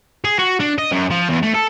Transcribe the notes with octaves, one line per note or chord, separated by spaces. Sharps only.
G#4
F#4
D4
D#5
F#2
F3
E2
A3
A4